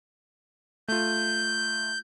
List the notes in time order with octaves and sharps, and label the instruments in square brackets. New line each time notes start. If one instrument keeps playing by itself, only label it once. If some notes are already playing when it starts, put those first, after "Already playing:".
[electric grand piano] A3 F4 [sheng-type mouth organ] G6